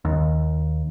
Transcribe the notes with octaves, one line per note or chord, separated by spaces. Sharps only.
D#2